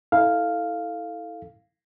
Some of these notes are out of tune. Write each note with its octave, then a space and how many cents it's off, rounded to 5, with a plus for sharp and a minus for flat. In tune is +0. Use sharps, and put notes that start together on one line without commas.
E4 -25 A4 +0 F5 +0